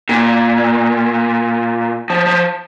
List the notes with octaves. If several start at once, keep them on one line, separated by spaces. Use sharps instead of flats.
A#2
F3
F3